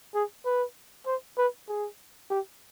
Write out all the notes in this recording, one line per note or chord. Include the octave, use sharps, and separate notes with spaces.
G#4
B4
C5
B4
G#4
G4